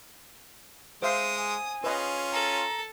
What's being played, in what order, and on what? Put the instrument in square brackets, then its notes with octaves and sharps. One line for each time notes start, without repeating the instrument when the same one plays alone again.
[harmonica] G#3 [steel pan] C5 E5 F5 [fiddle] D#6
[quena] G#5
[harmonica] C#4 F4 [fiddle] G#4 [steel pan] B4 D#5
[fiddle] A4 [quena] A#5